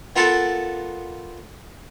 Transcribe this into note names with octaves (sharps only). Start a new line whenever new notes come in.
B3 F4 A4 A#4 F#5 A5